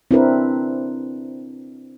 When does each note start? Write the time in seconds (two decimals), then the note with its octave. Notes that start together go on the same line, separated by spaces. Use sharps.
0.11 C4 D4 E4 G4 A#4 B4